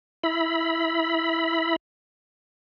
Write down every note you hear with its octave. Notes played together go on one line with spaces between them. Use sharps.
E4 B5